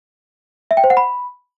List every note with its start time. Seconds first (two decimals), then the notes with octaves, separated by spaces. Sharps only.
0.71 E5
0.77 G5
0.84 C5
0.90 F#5
0.97 B5